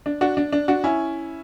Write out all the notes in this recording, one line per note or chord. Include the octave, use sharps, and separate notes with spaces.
D4
D4 F#4
D4
D4
D4 F#4
C#4 E4